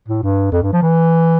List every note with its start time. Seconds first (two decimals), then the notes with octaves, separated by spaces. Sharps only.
0.08 A2
0.23 G2
0.52 F2
0.62 G2
0.73 F3
0.82 E3